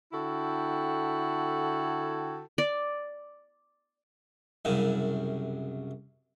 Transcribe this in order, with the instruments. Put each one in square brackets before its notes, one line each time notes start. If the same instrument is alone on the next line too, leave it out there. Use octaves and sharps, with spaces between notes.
[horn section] D3 E4 F#4 A4 G5
[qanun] D5
[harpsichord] C2 F#2 C#3